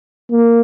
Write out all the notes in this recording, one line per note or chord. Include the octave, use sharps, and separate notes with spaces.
A#3